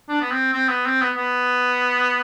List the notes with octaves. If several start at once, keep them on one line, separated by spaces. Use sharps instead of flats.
D4
B3
C4
C4
B3
C4
B3
B3